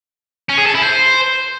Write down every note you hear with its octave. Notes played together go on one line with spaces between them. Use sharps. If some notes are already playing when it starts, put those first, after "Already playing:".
C#4
G#4
A4
E4
C5